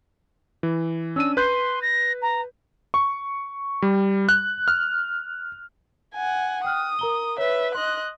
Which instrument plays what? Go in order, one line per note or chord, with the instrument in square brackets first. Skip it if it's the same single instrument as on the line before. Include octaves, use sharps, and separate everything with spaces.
[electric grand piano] E3
[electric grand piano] C#4 D4 D#7 [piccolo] E6
[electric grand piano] B4 F#6 G6 [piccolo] C6
[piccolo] A#6
A#5
[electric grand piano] C#6
G3
F#6
F6
[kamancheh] F#5 G#5
[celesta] G5 F6 F#6 [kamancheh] D#6
[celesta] A#4 A#5 G7
[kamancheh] B4 E5 [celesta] C#5
[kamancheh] D#5 F#6 [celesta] C6